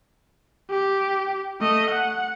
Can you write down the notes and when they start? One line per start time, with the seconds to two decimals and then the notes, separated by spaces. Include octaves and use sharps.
0.71 G4
1.61 A3 D#5
1.91 F#5